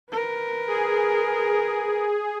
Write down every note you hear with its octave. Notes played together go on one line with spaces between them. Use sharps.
A#4 B4
G#4